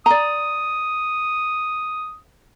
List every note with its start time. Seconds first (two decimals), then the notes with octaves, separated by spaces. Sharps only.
0.06 D5 A#5 D#6